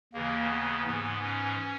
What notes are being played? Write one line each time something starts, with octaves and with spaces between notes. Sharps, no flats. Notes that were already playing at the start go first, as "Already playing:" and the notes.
D#2 C#3 E3 A#3
B3
G#2 E3 B3
C#4